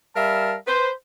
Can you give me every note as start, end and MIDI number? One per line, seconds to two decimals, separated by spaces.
0.16 0.55 55
0.16 0.55 70
0.16 0.55 76
0.16 0.55 77
0.16 0.55 81
0.67 0.90 71
0.67 0.90 72